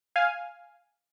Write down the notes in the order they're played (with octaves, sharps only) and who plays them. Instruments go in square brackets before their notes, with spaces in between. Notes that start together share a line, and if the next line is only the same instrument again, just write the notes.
[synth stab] F5 G#5